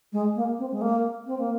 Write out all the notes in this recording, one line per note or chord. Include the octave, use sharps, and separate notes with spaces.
G#3
A#3
C4
G#3
A#3
C4
A#3